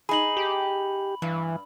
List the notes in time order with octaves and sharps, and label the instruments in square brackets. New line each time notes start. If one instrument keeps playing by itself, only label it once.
[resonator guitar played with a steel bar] D#4 G#4 [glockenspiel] B5 F#7
[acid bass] G4
[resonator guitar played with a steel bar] G2 [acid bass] E3